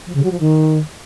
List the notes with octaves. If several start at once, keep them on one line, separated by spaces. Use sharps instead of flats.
F3
C#3
F#3
F3
D#3